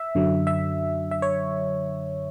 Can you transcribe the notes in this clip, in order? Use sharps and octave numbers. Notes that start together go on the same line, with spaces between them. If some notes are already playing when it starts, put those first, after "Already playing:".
Already playing: E5
F#2 D3 F#3
E5
E5
C#5